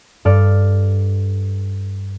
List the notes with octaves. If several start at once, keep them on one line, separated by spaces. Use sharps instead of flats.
G2 A4 D5 F6